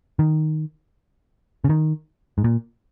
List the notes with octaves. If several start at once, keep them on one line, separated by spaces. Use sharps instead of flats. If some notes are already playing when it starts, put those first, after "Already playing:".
D#3
C#3
D#3
G#2
A#2